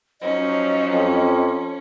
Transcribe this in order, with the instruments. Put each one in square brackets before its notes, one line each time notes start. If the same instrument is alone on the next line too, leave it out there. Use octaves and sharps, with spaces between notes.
[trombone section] F3 F#3 D#4 [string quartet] C#4 [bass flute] D#5
[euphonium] F2